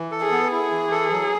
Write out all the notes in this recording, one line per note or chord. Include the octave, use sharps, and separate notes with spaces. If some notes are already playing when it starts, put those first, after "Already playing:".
Already playing: E3
A4
G#4
B3
E4 G#4
E3
A4
F#3